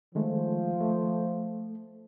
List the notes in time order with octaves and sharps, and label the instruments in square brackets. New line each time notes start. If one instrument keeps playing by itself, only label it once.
[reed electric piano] D#3 G#3 A3 [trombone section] F3
[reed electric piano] A3